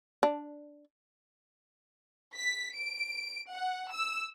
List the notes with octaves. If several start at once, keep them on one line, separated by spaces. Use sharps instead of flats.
D4
B6
D7
F#5
E6